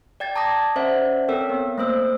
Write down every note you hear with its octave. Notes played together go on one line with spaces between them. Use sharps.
D5 G5 G#6 A6
A5 A#5 D6 D#6 G#6 A#6
C#4 C5 D5 E5 F#5
C4 A4 A#4 C#5 G5 E6
B3
A3 A#3 C5 E6